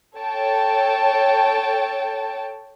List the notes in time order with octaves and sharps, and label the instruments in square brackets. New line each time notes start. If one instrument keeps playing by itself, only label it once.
[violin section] A4 C#5 G5 A5